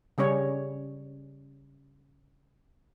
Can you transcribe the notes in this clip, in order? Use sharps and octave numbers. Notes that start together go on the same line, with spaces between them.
C#3 G3 C#4 C#5